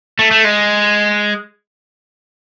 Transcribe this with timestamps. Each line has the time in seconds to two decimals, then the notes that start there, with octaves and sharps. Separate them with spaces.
0.19 A3
0.31 A3
0.44 G#3